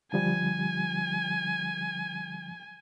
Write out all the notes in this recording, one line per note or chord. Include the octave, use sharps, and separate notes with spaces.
D3 F3 G3 G#5